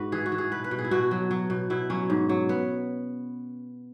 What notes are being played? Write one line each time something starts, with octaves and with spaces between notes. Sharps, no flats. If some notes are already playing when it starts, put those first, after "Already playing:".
Already playing: G#2 F#4 B4
E3 G#4
F#4
E3
G#4
B2 B4
B4
B2
G#4
E4
B2 F#4
F#3
F#3
B2
B2 E4
F#3 C#4
G#2
F#3
B3